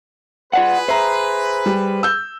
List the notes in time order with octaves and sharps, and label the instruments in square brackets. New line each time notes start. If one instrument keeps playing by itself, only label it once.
[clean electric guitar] F4 D5 F#5 [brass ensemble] G#4 B4
[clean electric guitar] C5 [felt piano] E5 A#5
[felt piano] G3
E6 G6